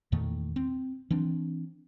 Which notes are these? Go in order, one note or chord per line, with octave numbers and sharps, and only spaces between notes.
E2 A#2 D#3 A3
C4
E3 C4 D4